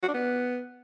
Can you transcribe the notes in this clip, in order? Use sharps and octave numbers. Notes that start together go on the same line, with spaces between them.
F#4
D4
B3